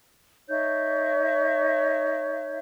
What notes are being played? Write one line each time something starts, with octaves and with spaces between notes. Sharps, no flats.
D#4 C#5 E5 G6